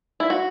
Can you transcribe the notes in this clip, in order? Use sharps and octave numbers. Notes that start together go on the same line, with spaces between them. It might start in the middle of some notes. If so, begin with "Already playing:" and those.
E4
F#4